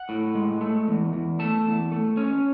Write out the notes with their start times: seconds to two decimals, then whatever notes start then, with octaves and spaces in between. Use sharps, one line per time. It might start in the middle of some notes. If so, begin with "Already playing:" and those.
Already playing: F#5
0.09 A2
0.35 G#3
0.61 A3
0.87 E2
1.13 E2
1.39 A3 A5
1.66 E2
1.92 A3
2.17 C#4